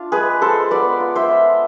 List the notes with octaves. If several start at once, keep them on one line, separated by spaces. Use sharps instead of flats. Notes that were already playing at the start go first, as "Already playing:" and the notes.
Already playing: D4 F4
G#3 G#4 B4
G#3 A4 C5
B3 B4 D5
F4
C5 E5
F4